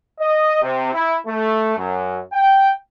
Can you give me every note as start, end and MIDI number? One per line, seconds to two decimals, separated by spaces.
0.20 0.62 75
0.62 0.91 48
0.93 1.15 64
1.26 1.75 57
1.77 2.19 42
2.32 2.71 79